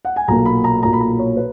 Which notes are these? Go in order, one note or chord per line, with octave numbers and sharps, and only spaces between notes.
F#5
G#5
B1 A#2 F#3 A#3 A#5
B5
A#5
B1 A#2 F#3 A#3 A#5
B5
A#5
C#5
B4